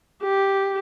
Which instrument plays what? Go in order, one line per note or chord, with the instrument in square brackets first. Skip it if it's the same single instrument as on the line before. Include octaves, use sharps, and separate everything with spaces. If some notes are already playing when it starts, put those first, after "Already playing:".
[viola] G4